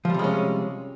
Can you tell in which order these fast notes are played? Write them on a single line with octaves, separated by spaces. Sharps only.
F3 G3 C3 G#3 C#4